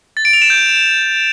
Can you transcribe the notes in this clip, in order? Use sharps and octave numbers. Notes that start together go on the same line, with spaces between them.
A6
D7
F7
E7
G6